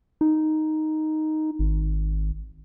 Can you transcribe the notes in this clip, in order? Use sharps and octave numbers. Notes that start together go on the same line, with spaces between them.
D#4
G#1